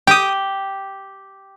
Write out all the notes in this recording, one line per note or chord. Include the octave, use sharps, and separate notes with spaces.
G4 G5 D#6